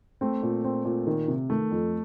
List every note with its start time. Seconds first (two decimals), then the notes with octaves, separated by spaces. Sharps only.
0.21 A3 C4
0.43 A#2
0.64 C4
0.85 A#2
1.07 D#3
1.28 C3
1.49 D#3 A3
1.71 F2